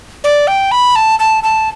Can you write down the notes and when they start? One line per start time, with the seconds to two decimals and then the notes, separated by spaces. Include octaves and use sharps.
0.24 D5
0.47 G5
0.71 B5
0.96 A5
1.19 A5
1.44 A5